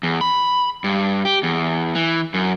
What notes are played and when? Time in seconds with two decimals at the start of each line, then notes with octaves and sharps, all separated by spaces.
0.03 E2
0.21 B5
0.84 G2
1.25 G4
1.43 E2
1.95 E3
2.34 F#2